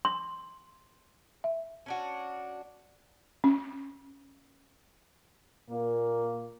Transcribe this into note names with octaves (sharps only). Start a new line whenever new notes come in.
C6
E5
C#4 D4 F#4
C#4
A#2 A#3